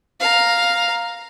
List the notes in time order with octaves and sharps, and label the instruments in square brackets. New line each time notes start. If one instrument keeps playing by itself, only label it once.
[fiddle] F5 A#5